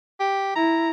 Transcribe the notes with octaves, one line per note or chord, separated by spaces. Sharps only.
G4
E4 A#5